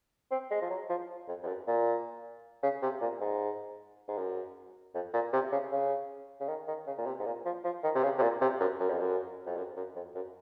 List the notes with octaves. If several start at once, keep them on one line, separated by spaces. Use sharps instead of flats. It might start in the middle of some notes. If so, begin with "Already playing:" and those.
C4
G#3
F3
F#3
F3
F2
F2
F#2
A#2
C#3
C3
A#2
G#2
G#2
F#2
F2
A#2
C3
C#3
C#3
C#3
D#3
D#3
C#3
A#2
C3
G#2
A#2
F3
F3
D#3
C3
C#3
C3
A#2
C3
F#2
F#2
F2
F#2
F2
F#2
F#2
F2
F#2